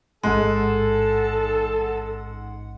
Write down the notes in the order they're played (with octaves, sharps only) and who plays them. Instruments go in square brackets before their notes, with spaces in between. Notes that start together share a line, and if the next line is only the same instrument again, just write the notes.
[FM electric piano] A1 G#2 F#5 [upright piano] G#3 [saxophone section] A4